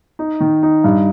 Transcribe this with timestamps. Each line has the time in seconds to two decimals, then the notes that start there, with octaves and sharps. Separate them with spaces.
0.19 D#4
0.40 D#3
0.63 D#4
0.84 G2